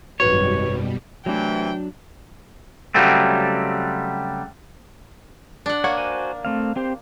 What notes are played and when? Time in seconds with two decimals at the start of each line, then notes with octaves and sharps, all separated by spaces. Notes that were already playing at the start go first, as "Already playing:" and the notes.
0.20 G#1 F#2 B2 G3 F#4 B4 C#5
1.26 C3 E3 F#3 A3 D4 G5
2.95 C#3 F#3 G3 A3 C4
5.66 D4 F#5
5.84 A#3 C#5 F#5 C#6
5.97 F#4 C5 G#5
6.45 A3 C4 F5
6.76 C4 G4 C5